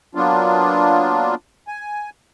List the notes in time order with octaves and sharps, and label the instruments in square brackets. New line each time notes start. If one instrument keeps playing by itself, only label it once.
[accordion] F#3 A#3 B3 D4 F4
G#5